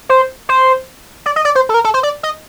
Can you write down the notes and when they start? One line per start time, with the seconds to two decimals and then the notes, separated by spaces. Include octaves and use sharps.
0.09 C5
0.49 C5
1.26 D5
1.36 D#5
1.45 D5
1.55 C5
1.69 A4
1.74 A#4
1.84 A4
1.94 C5
2.03 D5
2.23 D#5